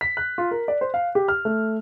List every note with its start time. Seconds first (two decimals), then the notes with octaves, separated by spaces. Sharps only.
0.01 B6
0.17 F#6
0.38 F4
0.51 A#4
0.68 D5
0.81 C5
0.94 F5
1.15 G4
1.28 F6
1.45 A3